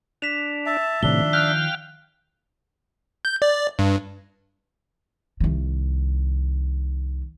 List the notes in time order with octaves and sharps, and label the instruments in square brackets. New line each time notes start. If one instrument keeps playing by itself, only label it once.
[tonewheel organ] D4 [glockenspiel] B6 E7 F7
[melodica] E5 A5
[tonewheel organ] A2 C3 [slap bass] D#3 F3 [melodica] D4 E5 [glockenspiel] G7
[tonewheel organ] F5 G5 F6 [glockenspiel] F#6
[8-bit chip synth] G6
D5
G2
[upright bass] C2 D#3